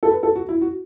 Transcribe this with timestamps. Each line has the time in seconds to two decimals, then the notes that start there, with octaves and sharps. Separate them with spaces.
0.03 A4
0.09 B4
0.23 A4
0.35 F#4
0.49 E4
0.61 F#4